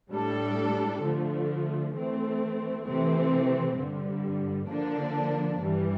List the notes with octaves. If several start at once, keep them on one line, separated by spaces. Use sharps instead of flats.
A2 G3 D4 A4
D3 F3 A3
E3 A3 C4
C3 E3 A3 C4
G2 D3 G3
D3 F3 A#3 D4
G2 E3 G3